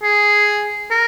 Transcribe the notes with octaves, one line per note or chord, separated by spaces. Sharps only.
G#4
A#4